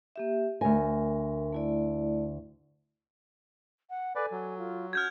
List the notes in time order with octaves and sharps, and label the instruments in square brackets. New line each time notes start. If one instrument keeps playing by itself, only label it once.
[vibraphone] A#3 G4 E5
[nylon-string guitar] D2 G#5 [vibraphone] A#4
[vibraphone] A3 E4 D5
[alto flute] F#5
[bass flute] A4 [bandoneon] B4 D5 [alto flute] G#5
[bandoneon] F#3
[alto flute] F4
[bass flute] C#4 [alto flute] F#4 [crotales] F6 G6 G#6